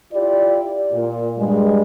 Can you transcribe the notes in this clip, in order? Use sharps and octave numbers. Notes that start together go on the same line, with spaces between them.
E4 F4 G4 D5
A#2
G2 G3 G#3